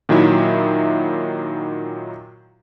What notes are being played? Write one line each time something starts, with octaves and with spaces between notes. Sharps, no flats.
A#2 D#3 F#3 E4 E5